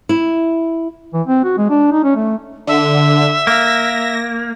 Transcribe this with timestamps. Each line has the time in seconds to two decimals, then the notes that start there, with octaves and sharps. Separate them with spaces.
0.09 E4
1.14 E3
1.27 C4
1.44 F#4
1.57 G#3
1.70 D4
1.92 D#4
2.04 C#4
2.16 A3
2.67 D3 E5
3.47 A#3 A#6